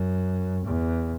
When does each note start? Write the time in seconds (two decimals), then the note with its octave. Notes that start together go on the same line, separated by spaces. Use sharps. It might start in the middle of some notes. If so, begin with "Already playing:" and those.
Already playing: F#2
0.65 E2